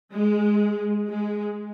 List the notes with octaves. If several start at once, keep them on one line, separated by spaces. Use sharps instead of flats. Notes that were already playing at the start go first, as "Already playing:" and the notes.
G#3
G#3